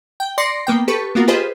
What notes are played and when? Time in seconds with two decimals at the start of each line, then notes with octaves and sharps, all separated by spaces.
0.20 G5
0.38 D5 C6 A#6 C7 C#7
0.67 A#3 B3 G5
0.88 G4 A4 B4 C#6
1.15 A#3 B3 F4 F#4 A#4
1.28 F4 G4 G#4 B4 C5 D#5